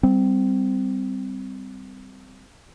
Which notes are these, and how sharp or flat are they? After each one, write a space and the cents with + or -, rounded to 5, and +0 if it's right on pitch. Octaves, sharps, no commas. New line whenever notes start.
G3 +0 C4 -15